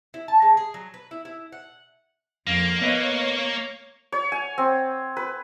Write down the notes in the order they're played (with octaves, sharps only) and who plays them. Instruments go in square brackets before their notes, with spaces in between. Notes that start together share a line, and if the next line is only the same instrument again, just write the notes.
[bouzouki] E4
A5
G#3
G#4
F#3
B4
E4
E4
F#5
[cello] F2 F5 [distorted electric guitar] A#3
[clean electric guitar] B3 B4 D#5 [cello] C#5 F5
[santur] C#5
G#5
C4
B4